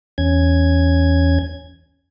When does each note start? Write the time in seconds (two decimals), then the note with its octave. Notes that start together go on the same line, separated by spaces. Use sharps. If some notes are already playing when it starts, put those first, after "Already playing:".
0.18 E2 C#4 G#6